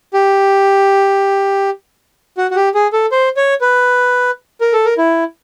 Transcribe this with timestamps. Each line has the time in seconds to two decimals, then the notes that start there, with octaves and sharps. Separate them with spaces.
0.14 G4
2.38 F#4
2.51 F#4
2.56 G4
2.75 G#4
2.93 A4
3.12 C5
3.37 C#5
3.61 B4
4.61 A#4
4.73 A4
4.85 A#4
4.98 E4